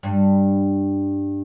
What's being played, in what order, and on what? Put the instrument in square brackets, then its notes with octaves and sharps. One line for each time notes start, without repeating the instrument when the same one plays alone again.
[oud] G2